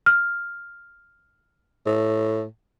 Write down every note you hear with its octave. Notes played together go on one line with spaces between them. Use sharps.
F6
A2